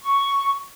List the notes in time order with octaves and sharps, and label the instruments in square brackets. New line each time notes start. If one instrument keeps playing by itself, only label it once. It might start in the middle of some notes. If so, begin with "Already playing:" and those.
[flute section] C#6